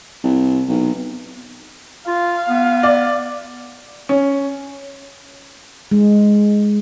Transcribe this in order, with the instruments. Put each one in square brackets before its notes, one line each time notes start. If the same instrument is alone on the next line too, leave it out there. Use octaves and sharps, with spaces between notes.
[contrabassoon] C2
B1
[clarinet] F4 [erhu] F5
[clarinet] B3
[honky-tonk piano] D5
[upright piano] C#4
[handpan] G#3